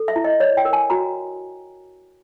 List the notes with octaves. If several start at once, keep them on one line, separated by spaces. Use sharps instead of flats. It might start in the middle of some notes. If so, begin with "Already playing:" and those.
Already playing: A4
E5
E4
D#5
C#5 D5
G5
A#4
G#5
F#4 A#5